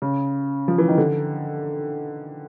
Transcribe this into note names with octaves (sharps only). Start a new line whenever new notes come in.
C#3
F3
E3
D#3
D3